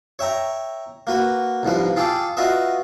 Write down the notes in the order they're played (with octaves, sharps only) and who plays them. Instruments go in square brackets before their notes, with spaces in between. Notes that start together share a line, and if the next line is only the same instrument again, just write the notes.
[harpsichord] C#5 E5 G5 A#5
A#3 F#4 B4
C2 G#2 F3 B4
F4 G#4 A4 G5 D6
F4 F#4 B4 D#5 E5